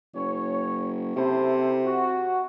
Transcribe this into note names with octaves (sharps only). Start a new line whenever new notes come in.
F#1 C#5
C3 E4 A4 C5
F#4